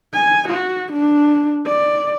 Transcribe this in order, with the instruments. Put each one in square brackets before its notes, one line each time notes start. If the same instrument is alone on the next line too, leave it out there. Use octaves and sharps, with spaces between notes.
[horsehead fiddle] G#5
F#4
D4
D5